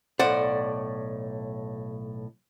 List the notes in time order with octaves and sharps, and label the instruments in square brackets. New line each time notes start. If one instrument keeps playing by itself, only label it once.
[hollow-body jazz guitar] B1 A2 C5 [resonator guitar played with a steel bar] D5 F#5